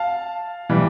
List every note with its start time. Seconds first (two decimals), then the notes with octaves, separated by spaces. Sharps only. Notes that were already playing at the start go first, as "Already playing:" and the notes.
Already playing: F5 A5
0.70 E3 G3